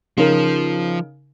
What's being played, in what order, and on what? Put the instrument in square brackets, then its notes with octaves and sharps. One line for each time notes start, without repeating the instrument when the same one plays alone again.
[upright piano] C#3 D#4 A#4 [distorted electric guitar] F3